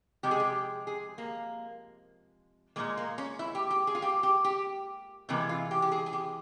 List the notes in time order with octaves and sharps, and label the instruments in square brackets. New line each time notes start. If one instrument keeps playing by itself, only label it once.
[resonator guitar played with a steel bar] C3 F3 G#3 G4
G#4
G4
G#4
A#3
A#2 F3 G#3 A#3
A#3
C#4
E4
G4
G4
G#4
F4
G4
G4
G4
C3 E3 G#3 A#3
F4
G4
G4
G#4
G#4
G4